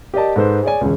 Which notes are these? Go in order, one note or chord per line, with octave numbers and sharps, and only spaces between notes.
G4 A#4 D5 D#5 A5
G#2 A4 B4 C5
G#4 C#5 D5 G#5
E1 C#2